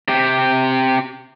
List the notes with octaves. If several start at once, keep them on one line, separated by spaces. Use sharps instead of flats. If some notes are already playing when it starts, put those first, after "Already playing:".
C3 G4